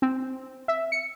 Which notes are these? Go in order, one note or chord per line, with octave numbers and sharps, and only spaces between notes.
C4
E5
C#7